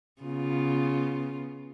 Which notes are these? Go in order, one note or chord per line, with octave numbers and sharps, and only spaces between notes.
C#3 B3 F4